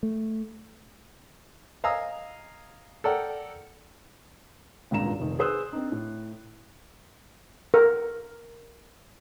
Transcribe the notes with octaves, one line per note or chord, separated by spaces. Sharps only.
A3
D#5 F5 G#5 A#5 D#6 E6
A4 A#4 D5 F#5 G5
G#1 C#2 G2 A#2 A#5 E7
F1 D#3
G#4 B4 C5 D#6 E6 F#6
C4 D4 D#4
A2
A#4